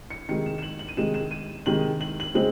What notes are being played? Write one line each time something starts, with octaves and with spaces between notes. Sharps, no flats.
C#7
C3 D#3 G#3 C#7
E7
E7
F#7
F#7
D#7
C3 D#3 G#3 E7
E7
D#7
C3 D#3 G#3 F#7
F#7
F#7
C#3 G#3 C4 F#7